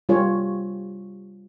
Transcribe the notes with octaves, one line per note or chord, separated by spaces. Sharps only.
G3 F4 G4 C#5